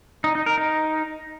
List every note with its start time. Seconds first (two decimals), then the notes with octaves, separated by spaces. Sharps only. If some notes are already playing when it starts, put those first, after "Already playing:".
0.24 D#4
0.35 D#4
0.46 A#4
0.58 D#4